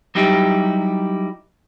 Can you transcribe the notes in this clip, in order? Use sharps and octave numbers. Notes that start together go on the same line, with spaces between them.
F#3 G3 D#4 E4 G4